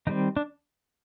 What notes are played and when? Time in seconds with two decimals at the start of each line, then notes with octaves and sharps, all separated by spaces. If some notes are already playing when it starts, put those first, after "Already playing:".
0.07 D#3 G3 C4 D#4
0.36 D4